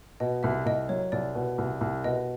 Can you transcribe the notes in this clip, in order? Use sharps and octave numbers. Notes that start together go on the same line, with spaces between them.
B2 D#5
C2 E5
C2 D#5
F#3 C#5
C2 D5
B2
C2
C2
B2 D#5